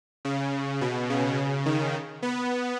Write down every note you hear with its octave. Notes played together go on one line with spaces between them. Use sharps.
C#3
B2
C#3
D#3
B3